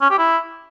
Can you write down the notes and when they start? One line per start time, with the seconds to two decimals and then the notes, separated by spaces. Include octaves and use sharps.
0.01 C#4
0.10 G4
0.18 E4